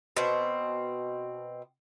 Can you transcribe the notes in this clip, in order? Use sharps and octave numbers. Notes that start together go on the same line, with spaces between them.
B2 C4